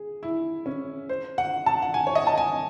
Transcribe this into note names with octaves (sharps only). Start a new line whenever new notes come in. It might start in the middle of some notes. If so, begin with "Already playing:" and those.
Already playing: G#4
E4
C#4
C5
F#5
A5
F#5
G#5
C#5
D#5
A5
G#5